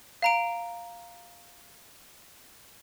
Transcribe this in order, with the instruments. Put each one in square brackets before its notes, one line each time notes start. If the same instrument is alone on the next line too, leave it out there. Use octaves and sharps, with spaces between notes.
[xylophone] F5 A#5 D7